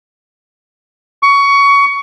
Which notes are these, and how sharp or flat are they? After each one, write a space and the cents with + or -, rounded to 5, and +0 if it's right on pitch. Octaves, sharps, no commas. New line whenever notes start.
C#6 +20